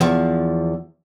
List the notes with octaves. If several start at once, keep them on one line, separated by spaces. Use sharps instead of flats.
E2 F3